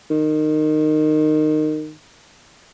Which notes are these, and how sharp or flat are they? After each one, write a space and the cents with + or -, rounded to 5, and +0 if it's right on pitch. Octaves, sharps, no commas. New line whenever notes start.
D#3 -20